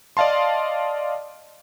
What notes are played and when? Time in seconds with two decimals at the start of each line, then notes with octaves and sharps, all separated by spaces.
0.17 D5 D#5 F5 A5 C6